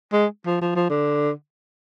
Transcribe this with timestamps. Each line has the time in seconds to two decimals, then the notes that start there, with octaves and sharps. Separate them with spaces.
0.12 G#3
0.46 F3
0.61 F3
0.76 F3
0.90 D3